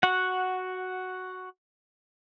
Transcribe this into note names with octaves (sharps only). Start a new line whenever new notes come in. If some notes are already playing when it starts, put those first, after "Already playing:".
F#4 F#5